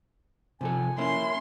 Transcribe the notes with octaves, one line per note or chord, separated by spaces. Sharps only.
C3 F3 A4 G#5
A#3 C#4 E4 C6